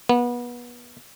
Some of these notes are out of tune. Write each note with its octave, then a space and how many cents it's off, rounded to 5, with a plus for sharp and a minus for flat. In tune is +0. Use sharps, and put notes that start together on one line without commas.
B3 -30